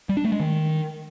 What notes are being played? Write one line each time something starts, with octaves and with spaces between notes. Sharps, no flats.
G3
D4
A3
G#3
D#3